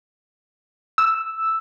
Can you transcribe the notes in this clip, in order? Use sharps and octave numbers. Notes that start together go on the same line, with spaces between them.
E6